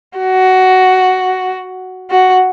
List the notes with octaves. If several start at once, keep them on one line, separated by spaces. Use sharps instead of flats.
F#4
F#4